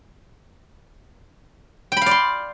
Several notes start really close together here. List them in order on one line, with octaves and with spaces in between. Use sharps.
G5 B5 F5 D5 C6